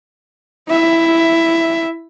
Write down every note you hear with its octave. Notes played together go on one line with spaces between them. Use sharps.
E4 E5